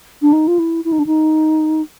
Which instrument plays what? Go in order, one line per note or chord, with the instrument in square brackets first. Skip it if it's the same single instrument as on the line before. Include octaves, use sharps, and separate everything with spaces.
[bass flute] D4
D#4
F4
E4
E4
D#4
D4
D#4